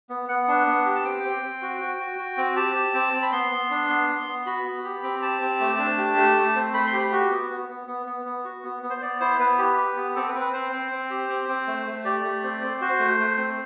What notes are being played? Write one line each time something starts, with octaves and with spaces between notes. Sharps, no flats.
B3
B3 F#5
D4
B3
G4
A5
C4 G5
C4
C4
F#4
F#4
F#4
F#4
C4
G4 A5
G4
C4
C4
B5
B3 C6
B3
D4
B3
B3
B3
F#4 B5
B3
G4
C4
G4 A5
C4
A3
D4
G4
A3
A3
C4
A3 B5
C6
G4
B5
F#4
B3
B3
B3
B3
B3
B3
F#4
B3
B3
C5
B3 D5
E4 C5
B3 B4
G4
G4
B3
C4 A4
B4
C4
B4
C4 C5
C4
C4
G4
C4
C4
A3
A3
G4 D5
A3
C4
C4
F#4 C5
A3
A3
C4